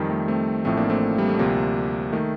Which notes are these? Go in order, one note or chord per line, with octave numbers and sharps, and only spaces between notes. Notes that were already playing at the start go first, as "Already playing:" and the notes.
Already playing: F2 D#3 G3
A3
A3 C4
A1 A2 F3 A3 C4
A#3 D4
A3 C4
G3
A3
D2 C3 F3 G3 A#3
D#3 A3